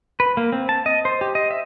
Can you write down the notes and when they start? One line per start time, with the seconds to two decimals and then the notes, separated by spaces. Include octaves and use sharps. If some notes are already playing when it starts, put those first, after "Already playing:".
0.20 B4
0.37 A#3
0.52 C4
0.69 A5
0.86 D#5
1.05 C5
1.21 G4
1.35 D#5
1.51 E5